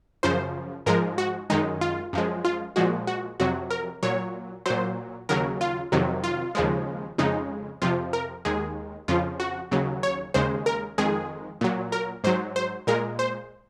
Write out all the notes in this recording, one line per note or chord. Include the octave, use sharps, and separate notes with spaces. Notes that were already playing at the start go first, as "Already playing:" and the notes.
F#2 C#3 F3 C5
G#2 F3 G#3 A#4
F#4
F#2 D#3 G#3 D#4
F4
F#2 F3 G#3
F4
A#2 F3 G#3 F#4
F#4
F2 C3 F#3 F#4
A#4
A#2 F#3 C#5
A#2 F#3 C5
D#2 C#3 F#3 A#4
F4
F2 C3 D#3 F#3
F4
D#2 C#3 F3 G#3
F2 C#3 G#3 D#4
F2 C3 F3 F4
A#4
D#2 D#3 G#3 G#4
F2 C#3 F3 F4
F#4
D#2 C#3 F#3
C#5
D#2 C#3 G#3 C5
A#4
F2 D#3 G#3 G#4
A#2 F#3
A#4
G#2 F#3 C5
C5
A#2 G#3 A#4
C5